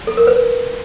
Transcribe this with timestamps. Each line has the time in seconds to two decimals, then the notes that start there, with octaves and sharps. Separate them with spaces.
0.07 A4
0.17 A#4
0.27 B4